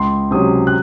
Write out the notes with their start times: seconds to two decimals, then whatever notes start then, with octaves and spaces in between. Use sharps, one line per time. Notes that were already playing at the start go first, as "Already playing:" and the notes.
Already playing: C#2 C6
0.31 C3 F#3 C#4 D#6
0.67 F#6